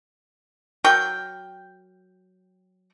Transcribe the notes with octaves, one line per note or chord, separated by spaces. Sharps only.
F#3 A#4 G5 C#6